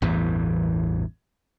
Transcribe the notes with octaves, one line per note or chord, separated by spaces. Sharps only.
A1 E2 G2 E3